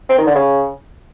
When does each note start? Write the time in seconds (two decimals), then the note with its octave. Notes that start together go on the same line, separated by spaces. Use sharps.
0.09 C4
0.18 D#3
0.26 D3
0.35 C#3